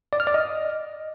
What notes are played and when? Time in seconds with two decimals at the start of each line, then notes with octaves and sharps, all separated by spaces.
0.13 D5
0.20 F6
0.27 D5
0.34 D#5